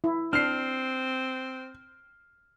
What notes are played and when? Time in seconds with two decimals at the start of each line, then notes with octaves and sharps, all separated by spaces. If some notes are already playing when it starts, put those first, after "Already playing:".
0.04 E4
0.33 C4 D4 F6 C7